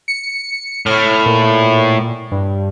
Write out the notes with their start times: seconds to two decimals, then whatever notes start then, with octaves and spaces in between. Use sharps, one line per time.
0.08 C#7
0.86 A2 F6
1.26 A#2
2.32 G2